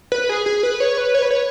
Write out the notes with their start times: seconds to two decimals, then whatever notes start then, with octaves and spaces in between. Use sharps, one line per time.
0.12 B4
0.29 G#4
0.46 G#4
0.63 B4
0.80 C#5
0.98 B4
1.15 C#5
1.22 B4
1.31 C#5